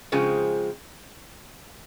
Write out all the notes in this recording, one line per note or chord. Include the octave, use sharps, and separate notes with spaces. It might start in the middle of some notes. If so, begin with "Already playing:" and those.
C#3 F3 G#3 C4